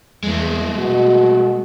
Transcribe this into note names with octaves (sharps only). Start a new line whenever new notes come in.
E2 G#3 A3
B2 F#4